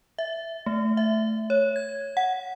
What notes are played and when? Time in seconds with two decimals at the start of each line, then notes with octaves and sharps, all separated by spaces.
0.18 E5
0.66 A3
0.97 E5
1.50 C#5
1.76 G#6
2.17 F#5